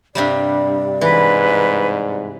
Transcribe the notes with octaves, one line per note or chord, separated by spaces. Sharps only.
G2 C3 G3 D5
G#2 E3 B4